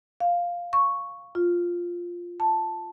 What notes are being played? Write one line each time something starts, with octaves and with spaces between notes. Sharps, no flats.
F5
C#6
F4
A5